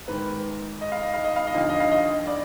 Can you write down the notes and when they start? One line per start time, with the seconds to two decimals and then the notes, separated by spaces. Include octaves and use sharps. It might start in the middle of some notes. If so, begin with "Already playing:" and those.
0.08 G#2 D#3 B4
0.81 D#5
0.92 F5
1.03 D#5
1.14 F5
1.25 D#5
1.36 F5
1.47 D#5
1.54 D#2 D3 F3 F5
1.69 D#5
1.80 F5
1.92 D#5
2.27 D5